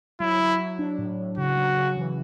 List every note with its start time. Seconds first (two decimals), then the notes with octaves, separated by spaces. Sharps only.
0.20 F#3 E4
0.40 F#3
0.59 F#3
0.79 D4
0.98 A2
1.18 A2
1.38 C#3 F#4
1.57 F#3
1.77 C#3
1.97 E3